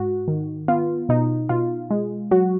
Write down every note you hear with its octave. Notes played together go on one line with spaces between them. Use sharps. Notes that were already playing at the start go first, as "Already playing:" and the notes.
Already playing: G#2 F#4
D#3
B3 F4
B2 D#4
B2 F4
G#3
F#3 F#4